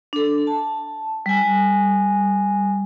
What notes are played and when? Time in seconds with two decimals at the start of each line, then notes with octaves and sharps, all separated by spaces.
0.13 D4 A4
0.47 A5
1.26 G3 G#5